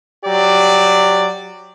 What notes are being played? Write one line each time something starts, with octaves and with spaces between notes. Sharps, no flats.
F#3 G4 D5